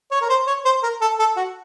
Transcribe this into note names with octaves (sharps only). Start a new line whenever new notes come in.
C#5
A#4
C5
C#5
C5
A#4
A4
A4
F#4